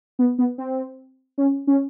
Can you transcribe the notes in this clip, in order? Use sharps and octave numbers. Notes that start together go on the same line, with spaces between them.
B3
B3
C4
C#4
C#4